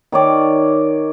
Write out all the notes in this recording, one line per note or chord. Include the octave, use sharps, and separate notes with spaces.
D#3 C#5 D5